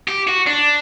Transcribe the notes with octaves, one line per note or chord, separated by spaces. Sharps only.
G4
F#4
D4